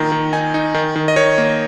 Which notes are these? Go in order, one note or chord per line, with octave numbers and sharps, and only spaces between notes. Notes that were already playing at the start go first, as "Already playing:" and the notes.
Already playing: A#2 D#3 A#5
D#3
D#4 G#5
D#4
D#3
D#3
D#5
D#3 C#5
A#3